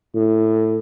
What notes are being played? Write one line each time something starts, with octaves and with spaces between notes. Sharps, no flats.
A2